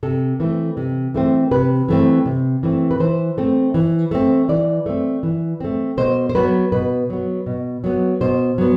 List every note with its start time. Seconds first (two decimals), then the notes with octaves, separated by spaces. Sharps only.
0.03 C3 A4
0.40 E3 A3 C4
0.77 C3
1.14 E3 A3 C4
1.51 C3 B4
1.88 E3 A3 C4
2.26 C3
2.63 E3 A3 C4
2.91 B4
3.00 E3 C5
3.38 A3 C4
3.74 E3
4.11 A3 C4
4.49 E3 D5
4.86 A3 C4
5.23 E3
5.60 A3 C4
5.97 B2 C5
6.29 C5
6.35 F#3 B3 B4
6.72 B2 B4
7.10 F#3 B3
7.46 B2
7.84 F#3 B3
8.21 B2 C5
8.58 F#3 B3